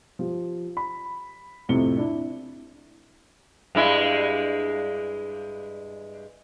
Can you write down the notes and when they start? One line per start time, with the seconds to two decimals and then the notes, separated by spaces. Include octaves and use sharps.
0.19 F3 G4
0.77 B5
1.69 F2 A2 C3 C#7 G7
1.97 D4 E4
3.75 G2 G#3 E4